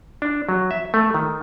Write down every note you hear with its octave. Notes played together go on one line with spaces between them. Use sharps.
D4
F#3
E5
A3
D#3